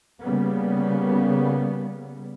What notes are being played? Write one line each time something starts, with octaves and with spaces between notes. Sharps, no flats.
C#3 G3 A#3 B3